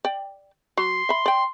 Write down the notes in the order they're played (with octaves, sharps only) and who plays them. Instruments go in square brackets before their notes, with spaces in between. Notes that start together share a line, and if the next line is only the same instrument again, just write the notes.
[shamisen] D5 G5
[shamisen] F#3 [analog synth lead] C6
[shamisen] E5 B5
D5 G5